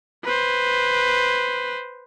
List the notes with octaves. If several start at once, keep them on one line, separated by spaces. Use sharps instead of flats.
B4 C5